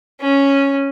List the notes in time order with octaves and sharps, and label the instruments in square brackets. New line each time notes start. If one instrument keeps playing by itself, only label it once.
[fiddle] C#4